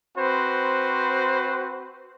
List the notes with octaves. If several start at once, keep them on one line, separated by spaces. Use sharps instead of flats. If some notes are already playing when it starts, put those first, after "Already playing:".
C4 F#4 B4 C5